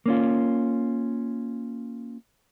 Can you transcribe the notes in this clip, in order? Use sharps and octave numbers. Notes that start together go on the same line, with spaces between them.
A#3 C#4 F4